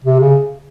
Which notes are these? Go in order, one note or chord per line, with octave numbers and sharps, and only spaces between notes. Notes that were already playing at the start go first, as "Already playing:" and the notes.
C3
C#3